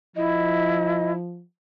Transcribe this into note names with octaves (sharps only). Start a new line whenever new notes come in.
F3 E4 D#5